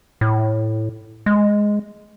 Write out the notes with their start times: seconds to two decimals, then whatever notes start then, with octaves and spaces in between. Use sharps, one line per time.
0.21 A2
1.26 G#3